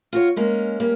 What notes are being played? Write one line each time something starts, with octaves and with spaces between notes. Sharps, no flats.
F4 F#4 C#5
G#3 A#3 C#4
G3 A#3 C#4